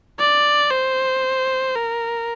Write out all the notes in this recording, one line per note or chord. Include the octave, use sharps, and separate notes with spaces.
D5
C5
A#4